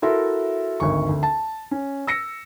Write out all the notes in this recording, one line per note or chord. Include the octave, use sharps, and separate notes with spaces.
E4 F#4 A4 A#4 E5 C6
G#1 D2 C#6
D2
A5
C#4
E6 A#6 C#7